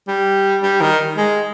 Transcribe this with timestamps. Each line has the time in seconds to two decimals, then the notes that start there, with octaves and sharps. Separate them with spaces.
0.08 G3
0.63 G3
0.81 D#3
1.17 G#3